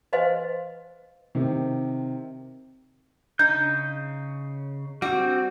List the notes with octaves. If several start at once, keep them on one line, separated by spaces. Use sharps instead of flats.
B4 C5 D#5 F5 G#5 C6
C3 D#3
C#3 D#4 G6
G3 C4 F#4